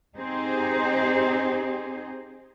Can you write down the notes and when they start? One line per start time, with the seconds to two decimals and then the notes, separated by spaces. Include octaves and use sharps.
0.17 C4 D#4 G4 G#4 C5